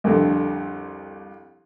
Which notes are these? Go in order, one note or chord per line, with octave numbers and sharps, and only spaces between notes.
C2 F2 D3